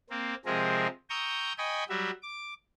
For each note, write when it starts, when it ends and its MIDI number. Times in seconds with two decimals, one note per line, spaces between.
0.10 0.35 58
0.10 0.35 60
0.45 0.87 48
0.45 0.87 53
0.45 0.87 56
0.45 0.87 60
0.45 0.87 68
0.45 0.87 70
1.10 1.53 79
1.10 1.53 82
1.10 1.53 85
1.10 1.53 87
1.10 1.53 88
1.10 1.53 91
1.58 1.84 75
1.58 1.84 79
1.58 1.84 80
1.58 1.84 83
1.58 1.84 85
1.58 1.84 87
1.89 2.10 54
1.89 2.10 55
1.89 2.10 66
1.89 2.10 76
2.23 2.54 86